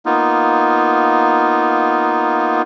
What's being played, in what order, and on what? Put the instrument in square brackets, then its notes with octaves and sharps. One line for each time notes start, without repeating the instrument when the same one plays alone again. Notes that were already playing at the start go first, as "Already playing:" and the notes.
[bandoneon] A#3 B3 D#4 F4